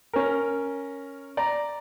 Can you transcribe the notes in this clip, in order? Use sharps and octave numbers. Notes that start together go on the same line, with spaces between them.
C#4 A#4
D5 A#5